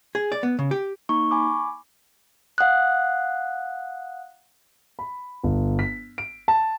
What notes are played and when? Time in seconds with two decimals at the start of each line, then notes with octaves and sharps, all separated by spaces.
0.15 G#4
0.32 D5
0.43 B3
0.59 C#3
0.71 G4
1.09 A#3 D#4 C#6
1.31 G#5 B5 D6
2.58 F5 F#5 D#6 F#6
4.99 B5
5.44 G1
5.79 B6
6.18 D7
6.48 A5